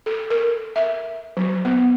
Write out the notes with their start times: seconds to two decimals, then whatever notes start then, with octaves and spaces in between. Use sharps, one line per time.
0.06 A4
0.30 A#4
0.76 E5
1.37 F#3
1.65 B3